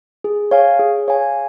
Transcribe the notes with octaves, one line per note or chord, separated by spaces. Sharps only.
G#4
C#5 F5 G#5
G#4
C#5 F5 G#5